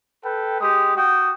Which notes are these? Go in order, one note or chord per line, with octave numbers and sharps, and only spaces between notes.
A4 B4 G5
G#3 G4 D#6
F#4 G5 D#6